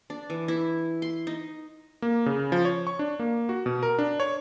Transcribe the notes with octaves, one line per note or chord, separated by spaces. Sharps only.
D4
E3
E4
C6
D#4
A#3
C#3
F3
C#5
C#6
D4
A#3
F#4
B2
A#4
D4
C#5